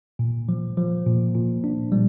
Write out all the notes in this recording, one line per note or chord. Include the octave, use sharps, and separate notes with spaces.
A#2
F3
F3
A#2
A#2
D4
G3